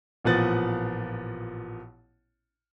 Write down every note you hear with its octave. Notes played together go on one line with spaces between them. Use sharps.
A1 A#2 F3 B3 F#5 A6